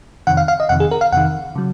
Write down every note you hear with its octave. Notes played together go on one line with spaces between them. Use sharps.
F2 C3 D#3 F#5
F5
F5
D#5
F2 C3 D#3 F#5
G#4
A#4
F5
F2 C3 D#3 F#5
C#3 F#3